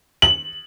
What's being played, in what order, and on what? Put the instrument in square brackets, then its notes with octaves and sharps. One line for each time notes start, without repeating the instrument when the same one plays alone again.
[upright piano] F#7